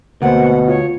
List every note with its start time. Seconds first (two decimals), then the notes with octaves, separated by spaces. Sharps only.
0.22 D2 B2 A#3 C5 F#5
0.68 F4 C#5